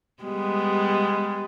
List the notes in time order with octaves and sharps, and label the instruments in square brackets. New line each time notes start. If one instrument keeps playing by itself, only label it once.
[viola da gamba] G3 G#3 B3